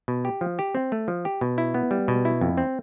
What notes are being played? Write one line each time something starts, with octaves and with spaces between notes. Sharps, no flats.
B2
G4
F3
G4
C4
A3
F3
G4
B2
E4
B3
G3
B2
E4
F2
C4